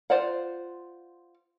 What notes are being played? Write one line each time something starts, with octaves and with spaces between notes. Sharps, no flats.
F4 C5 D5 F#5